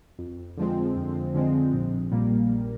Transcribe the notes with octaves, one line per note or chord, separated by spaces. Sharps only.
F2
D3 F3 G#3 C4
F2
D3 F3 G#3 C4
A#1
A#2 G3 A#3
A#1